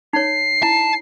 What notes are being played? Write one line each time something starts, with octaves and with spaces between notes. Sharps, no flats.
D#4 C#5 C7
E4 A5